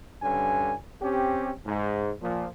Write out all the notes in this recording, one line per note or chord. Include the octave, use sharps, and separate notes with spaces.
G2 D3 C#4 G#5
C4 C#4 G4
G#2
A#2 F3